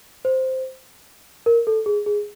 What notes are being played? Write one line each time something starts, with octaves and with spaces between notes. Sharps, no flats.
C5
A#4
A4
G#4
G#4